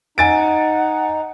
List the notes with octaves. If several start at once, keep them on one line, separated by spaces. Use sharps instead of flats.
D#4 F#5 G#5 A6 D7